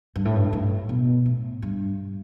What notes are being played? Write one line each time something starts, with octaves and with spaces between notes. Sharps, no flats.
G2
A2
G2
A2
B2
A2
G2